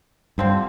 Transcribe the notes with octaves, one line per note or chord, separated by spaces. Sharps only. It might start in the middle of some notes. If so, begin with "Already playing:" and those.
G2 D3 F3 C4